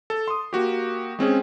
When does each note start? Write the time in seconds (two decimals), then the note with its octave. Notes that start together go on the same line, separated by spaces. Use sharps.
0.10 A4
0.28 C6 D#6
0.53 A#3 F#4 G4
1.19 G#3 C4 C#4 G#4